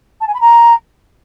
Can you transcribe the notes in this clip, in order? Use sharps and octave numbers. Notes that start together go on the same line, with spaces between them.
A5
G#5
B5
A#5